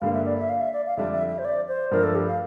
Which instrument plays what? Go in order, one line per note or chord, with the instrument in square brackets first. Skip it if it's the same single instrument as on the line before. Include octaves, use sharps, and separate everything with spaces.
[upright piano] G2 D3 G3 A#3 [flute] F5
[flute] E5
D5
E5
F5
E5
D5
F5
[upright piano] F2 D3 G3 D4 [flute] E5
[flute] E5
E5
C5
D5
C5
[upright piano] G2 F3 A3 D4 [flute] A#4
[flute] A4
G4
F5